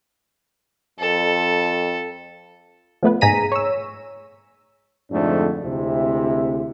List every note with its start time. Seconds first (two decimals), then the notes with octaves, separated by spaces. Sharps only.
0.99 F2 A4
3.03 F3 A3 B3 B4
3.21 G#2 G#4 A#5 B6 D#7
3.52 C#5 E6
5.12 F2 G#2 D3 A3 D4
5.62 D2 C3 G#3 C4 E4